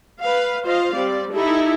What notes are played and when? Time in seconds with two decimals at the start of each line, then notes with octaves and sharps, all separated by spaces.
0.20 B4 F5
0.63 F4 C5 D#5 F5
0.93 G3 C4 D5
1.32 D#4 E4 G4 A4